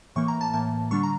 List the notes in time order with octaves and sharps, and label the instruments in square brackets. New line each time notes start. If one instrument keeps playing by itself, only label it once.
[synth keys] A2 E3 A#3 C#6
A#5
A5
A2 E3 A#3 A5
D3 G3 D4 C#6
A#5